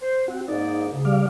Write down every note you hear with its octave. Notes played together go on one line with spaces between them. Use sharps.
C5
C4 F#4
G#2 A#3 D#4 D5
D2 C#3
G3 D5 F5